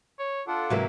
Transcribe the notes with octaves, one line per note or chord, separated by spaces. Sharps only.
C#5
D4 F4 A4 F#5
G#2 C3 E3 F#3 A#3